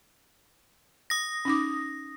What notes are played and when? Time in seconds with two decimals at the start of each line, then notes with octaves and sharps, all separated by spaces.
1.10 D#6 A#6
1.45 C#4 D#4 D6